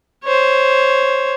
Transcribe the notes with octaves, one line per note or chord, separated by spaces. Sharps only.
C5 C#5